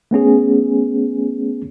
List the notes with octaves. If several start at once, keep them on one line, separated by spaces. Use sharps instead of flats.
A3 B3 C#4 G#4